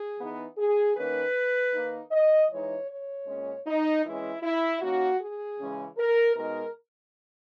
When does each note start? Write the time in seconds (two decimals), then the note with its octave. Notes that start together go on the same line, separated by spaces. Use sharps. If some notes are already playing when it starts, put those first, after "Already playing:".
Already playing: G#4
0.19 E3 B3 D#4
0.58 G#4
0.96 D#3 A#3 C#4 B4
1.73 D#3 A#3 D#4
2.11 D#5
2.50 E3 G#3 D#4 C#5
2.89 C#5
3.27 A#2 G#3 C#4
3.66 D#4
4.04 E3 G#3 C#4 E4
4.42 E4
4.81 D#3 A#3 C#4 F#4
5.20 G#4
5.59 C#3 E3 G#3 C#4
5.97 A#4
6.35 B2 G#3 D#4 A#4